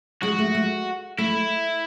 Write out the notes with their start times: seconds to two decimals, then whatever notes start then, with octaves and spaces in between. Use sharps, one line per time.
0.22 G#3 F#4
0.38 A3
0.55 A3
1.18 A3 E4